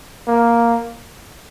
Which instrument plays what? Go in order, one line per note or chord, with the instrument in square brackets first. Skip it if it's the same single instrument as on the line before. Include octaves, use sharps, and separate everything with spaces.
[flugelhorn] A#3